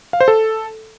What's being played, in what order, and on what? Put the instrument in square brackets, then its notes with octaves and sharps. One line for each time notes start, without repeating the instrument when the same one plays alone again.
[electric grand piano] F5
C5
A4